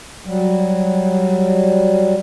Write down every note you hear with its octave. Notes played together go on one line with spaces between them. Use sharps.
F#3 G3